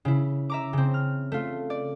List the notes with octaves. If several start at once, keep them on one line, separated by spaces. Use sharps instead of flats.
C#3 E4
E5 A#5 D6
C#3 C4
F6
A3 F4
D5